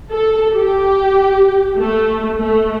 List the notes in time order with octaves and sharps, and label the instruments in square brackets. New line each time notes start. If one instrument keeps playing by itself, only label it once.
[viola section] A4
G4
A3
A3